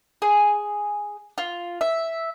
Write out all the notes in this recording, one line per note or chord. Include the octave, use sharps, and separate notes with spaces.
G#4
F4
E5